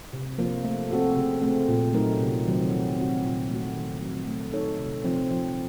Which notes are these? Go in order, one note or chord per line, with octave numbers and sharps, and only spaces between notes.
C3
F3 A#3
A3
C4 F#4 A4
C#3
A3 C4
A#2
F#3 A3 D#4 A#4
C3
D#3 F#3 C4
F3
C4 F#4
A#2
F3 A3 C4 F#4
D#3
F#3 C4 F#4
A3
D#4 A4 C#5
C3
F3 C4
F3